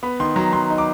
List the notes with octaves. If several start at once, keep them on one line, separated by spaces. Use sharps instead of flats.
B3 B5
D#3 C6
F#3 A#5
F#3 C6
D#4
D6